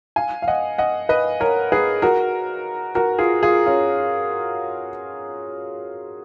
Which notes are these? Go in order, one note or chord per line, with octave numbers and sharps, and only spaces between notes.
F5 G#5
F5
D#5 F#5
D#5 F#5
B4 D#5
A#4 C#5
G#4 B4
F#4 A#4
F#4 A#4
F4 G#4
F4 G#4
C#4 F4